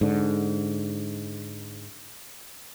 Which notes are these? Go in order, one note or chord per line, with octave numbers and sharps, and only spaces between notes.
G#2 D3